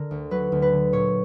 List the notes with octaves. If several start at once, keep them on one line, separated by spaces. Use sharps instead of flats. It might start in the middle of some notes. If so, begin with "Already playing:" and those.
Already playing: D3 A#4
D2
F#3 B4
D2
B4
D3
A#2 C#5